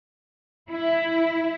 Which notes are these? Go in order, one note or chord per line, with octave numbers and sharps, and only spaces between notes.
E4